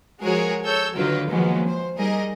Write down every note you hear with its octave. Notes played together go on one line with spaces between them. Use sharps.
F3 G#3 F#4 G#4 A#4 C#5
A4 C#5 E6 G6
D3 D#3 F#3 F4 A#4 B4
D#3 F3 F#3 G#3 A#3 B3
C5
G3 D#4 G#4 A#4 D#5